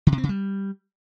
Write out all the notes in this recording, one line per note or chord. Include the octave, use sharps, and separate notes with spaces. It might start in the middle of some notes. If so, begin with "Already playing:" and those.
D3
C3
C4
C#3
G3